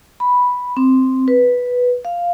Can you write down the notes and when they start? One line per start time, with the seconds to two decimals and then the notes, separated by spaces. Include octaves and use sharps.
0.20 B5
0.77 C4
1.28 B4
2.05 F5